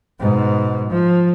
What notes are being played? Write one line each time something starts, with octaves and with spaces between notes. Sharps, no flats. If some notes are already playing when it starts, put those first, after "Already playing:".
G#2 B2
F3